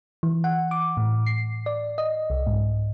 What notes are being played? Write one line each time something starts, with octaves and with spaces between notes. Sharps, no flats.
E3
F#5
D6
A2
C7
D5
D#5
C2
G#2